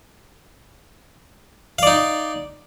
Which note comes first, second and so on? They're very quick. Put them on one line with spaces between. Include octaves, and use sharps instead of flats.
F5 D5 D#4